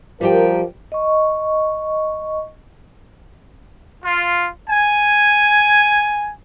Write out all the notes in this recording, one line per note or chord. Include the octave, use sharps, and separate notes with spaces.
F3 G3 G4 A#4 G5
D#5 C#6
F4
G#5